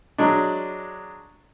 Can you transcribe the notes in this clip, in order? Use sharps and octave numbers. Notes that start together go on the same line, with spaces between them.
F#3 G#3 D4